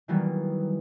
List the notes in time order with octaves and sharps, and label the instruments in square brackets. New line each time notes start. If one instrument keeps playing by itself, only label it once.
[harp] D#3 E3 F#3 G3 A#3 B3